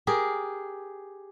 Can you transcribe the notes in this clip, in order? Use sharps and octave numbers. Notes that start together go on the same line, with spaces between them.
G4 G#4 A#4